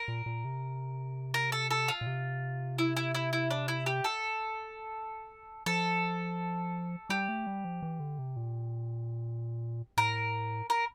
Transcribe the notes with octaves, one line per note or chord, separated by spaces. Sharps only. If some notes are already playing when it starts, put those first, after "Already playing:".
Already playing: A#4
A#2
A#2
C3
A#4
A4
A4
F4
A#2
C3
E4
E4
E4
E4
D4
E4
G4
A4
F3 A4
G3 G4
A3
G3
F3
E3
D3
C3
A#2
A2 A#4
A#4